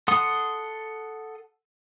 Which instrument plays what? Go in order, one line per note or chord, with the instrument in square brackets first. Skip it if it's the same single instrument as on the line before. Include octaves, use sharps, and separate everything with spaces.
[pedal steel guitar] A4 F#5 C6 D#6